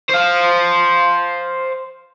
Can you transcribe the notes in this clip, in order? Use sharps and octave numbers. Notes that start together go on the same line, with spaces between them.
C5 F5